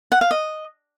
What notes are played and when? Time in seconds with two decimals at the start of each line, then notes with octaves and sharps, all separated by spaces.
0.12 F#5
0.21 F5
0.31 D#5